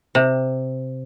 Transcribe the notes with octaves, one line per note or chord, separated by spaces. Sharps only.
C3